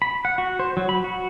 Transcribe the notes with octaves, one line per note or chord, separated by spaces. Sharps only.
B5
F#5
F#4
C5
F#3
B5
F#4